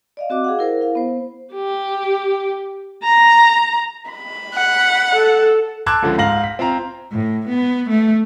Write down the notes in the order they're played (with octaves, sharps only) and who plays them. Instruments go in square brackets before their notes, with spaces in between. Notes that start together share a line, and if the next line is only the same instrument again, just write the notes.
[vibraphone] D5 D#5 F5
C4 F#4 D#5 D6
G#4 F5 F#5
E4 A#4 C5
E4 F5
B3 C5
[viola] G4
A#5
[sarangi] B5
[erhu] F#5
[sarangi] A4
[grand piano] A5 C6 D6 E6 F#6 G#6
C#2 D3 F3
G#2 F5 A#6 F#7
B6
C4 F4 F5 A#5
[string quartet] A2
B3
A3